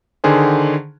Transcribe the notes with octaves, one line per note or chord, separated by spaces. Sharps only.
D3 D#3 G#4 C5